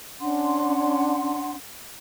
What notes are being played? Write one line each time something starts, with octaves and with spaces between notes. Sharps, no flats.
C#4 D4 F#5 C6